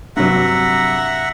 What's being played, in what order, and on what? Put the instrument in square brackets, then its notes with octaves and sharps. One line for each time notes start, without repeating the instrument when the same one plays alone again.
[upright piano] G2 C3 F#3 [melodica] E5 F#5 A#5